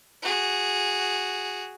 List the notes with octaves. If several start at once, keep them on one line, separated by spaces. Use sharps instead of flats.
F#4 G#4